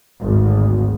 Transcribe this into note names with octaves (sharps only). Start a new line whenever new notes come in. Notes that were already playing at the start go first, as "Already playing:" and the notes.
G#1 D2